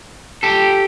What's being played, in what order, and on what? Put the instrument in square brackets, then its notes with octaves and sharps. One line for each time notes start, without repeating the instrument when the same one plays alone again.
[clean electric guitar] G4 A4